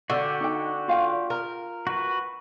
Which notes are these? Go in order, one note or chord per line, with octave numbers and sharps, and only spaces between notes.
D3 F#4 G4
D#4 G5
F4 F5 G5
A#4
F#4 B4